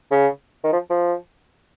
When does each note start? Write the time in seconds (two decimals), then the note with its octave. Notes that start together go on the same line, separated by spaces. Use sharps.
0.11 C#3
0.64 D#3
0.72 F3
0.90 F3